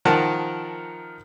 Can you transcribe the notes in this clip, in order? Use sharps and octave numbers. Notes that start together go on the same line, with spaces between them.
D#3 F3 A#4 F#5 A5